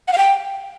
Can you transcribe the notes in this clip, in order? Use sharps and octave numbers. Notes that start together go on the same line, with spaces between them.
F#5
F5
G5